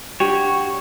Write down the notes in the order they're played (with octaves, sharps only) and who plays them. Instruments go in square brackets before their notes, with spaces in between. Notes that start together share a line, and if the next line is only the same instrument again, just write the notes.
[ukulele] D4 G4 [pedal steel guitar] F#4 C#5